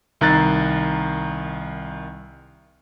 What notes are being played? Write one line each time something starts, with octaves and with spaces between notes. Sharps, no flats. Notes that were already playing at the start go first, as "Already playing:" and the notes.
C2 D#3 A#5 F#6 A6